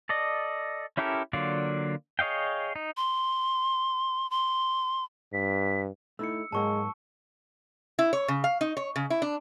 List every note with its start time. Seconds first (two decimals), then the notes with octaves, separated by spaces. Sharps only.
0.09 A4 D5 D#5
0.97 C#4 E4 G4 A4 A#4
1.33 D3 F#3 A#3 F4 D5
2.19 G#4 C#5 D#5 F5 G5
2.76 D#4
2.97 C6
4.31 C6
5.33 G2 B6
6.19 A3 D#4 E4 E6 C#7
6.52 G#2 F#3 G#3 A#3 A5 C#6 E6
7.99 E4
8.13 C#5
8.28 C#3
8.44 F5
8.61 D#4
8.77 C#5
8.96 C#3
9.10 E4
9.22 D4